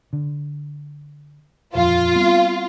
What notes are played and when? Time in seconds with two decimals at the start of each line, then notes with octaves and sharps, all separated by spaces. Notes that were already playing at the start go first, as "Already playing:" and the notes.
0.13 D3
1.75 D#1 F2 F4
2.16 G3 B3 C4